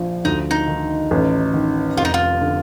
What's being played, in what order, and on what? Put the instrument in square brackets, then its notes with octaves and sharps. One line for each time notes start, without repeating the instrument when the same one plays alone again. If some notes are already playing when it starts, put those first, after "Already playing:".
Already playing: [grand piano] A#1 F3
[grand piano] D2 [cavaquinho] D#4
[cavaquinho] D#4
[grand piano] D#3
A1
D#3
[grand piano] F1 [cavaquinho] F4
[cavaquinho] D#4
F4
[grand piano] D3